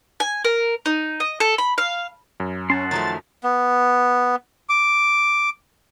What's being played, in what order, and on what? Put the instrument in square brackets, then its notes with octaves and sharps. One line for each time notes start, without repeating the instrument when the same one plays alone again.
[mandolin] G#5
A#4
D#4
D#5
A4
B5
F5
[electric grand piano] F#2
[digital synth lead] C#4 [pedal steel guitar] F#5 A5 C6
[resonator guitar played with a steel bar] D#3 F3 A3 [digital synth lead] A6
[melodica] B3
[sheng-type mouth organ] D6